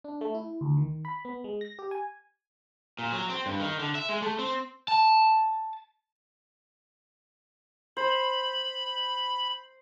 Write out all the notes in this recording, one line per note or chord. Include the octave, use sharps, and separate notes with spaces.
D4
A3
E4
D2
D#3
B5
B3
G#3
A#6
G4
G#5
A#2
F#3
C4
G2
D#3
D3
E5
G#3
A3
C4
A5
C5 B5